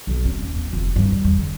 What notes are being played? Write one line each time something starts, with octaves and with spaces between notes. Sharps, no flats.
B1
C#4
D#2
B3
F1
G2
E2
E2
D3